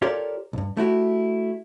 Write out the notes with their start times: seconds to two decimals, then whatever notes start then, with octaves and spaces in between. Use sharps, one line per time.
0.02 F4 G4 A4 A#4 C#5 D5
0.53 B1 G2
0.77 A3 E4 F#4 G4